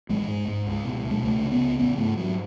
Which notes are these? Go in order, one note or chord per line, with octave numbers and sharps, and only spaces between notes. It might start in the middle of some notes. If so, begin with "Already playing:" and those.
A1 G#3
G#2
G#2
C#2
B2
B2
G#3
C#2 A3
C#3
B3
C#3
A1 B3
G#2 A3
G#2 F#3